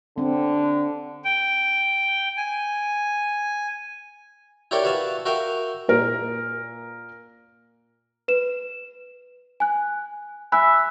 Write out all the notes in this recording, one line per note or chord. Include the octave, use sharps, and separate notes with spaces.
D3 C4
G5
G#5
E4 G4 A#4 C#5 D5 G5
F#4 B4 E5 F5 A5
F#4 A#4 E5 F5 G5
A#2 A#4
B4 E7
G#5 F#6
E5 G#5 B5 F#6